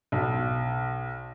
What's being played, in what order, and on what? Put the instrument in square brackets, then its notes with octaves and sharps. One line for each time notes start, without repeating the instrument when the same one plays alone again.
[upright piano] B1